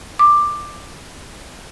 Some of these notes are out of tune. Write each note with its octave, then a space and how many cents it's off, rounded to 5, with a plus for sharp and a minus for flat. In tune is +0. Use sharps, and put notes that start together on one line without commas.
D6 +10